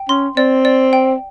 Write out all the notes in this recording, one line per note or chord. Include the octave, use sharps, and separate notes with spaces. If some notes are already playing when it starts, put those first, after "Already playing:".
Already playing: G5
C#4 C6
C4 D5
D5
G5